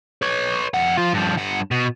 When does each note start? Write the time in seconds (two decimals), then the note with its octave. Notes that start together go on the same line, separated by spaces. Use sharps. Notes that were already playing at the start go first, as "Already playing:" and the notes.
0.22 B4 C#5
0.74 F2 F#5
0.98 F3 F4
1.14 G2 F3
1.38 G2 F#5
1.71 B2